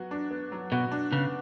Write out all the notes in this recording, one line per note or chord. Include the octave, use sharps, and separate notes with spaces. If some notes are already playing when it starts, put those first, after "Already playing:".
Already playing: F#3 B3 F#4
D4
B3
F#3
B2 F#4
D4
C#3 B3